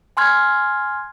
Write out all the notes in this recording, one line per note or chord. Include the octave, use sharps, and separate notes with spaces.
G#5 C6 F6 G#6